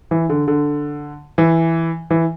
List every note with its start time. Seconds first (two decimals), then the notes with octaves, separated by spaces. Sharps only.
0.11 E3
0.29 D3
0.48 D3
1.38 E3
2.10 E3